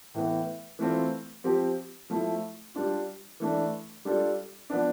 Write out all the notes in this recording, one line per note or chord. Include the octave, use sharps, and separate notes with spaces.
A2 E3 B3
E3 A3 C4 F4
F3 C4 G4
F3 A3 E4
G3 D4 F4
E3 A3 D4
G3 D4 F4 A4
F3 B3 D4